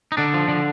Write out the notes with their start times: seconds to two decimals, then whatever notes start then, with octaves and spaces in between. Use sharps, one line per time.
0.12 D#4
0.17 D3 D4
0.34 F3
0.48 D3